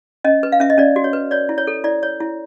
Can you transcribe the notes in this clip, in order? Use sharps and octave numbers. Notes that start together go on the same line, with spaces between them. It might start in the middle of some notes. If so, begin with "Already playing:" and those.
C#4 D#5
B4
F5
C#4 E5
D#5
C#4 D5
F#4
C#5
B4
C#5 D5
E4
C#5
A4
E4 D5
C#5
E4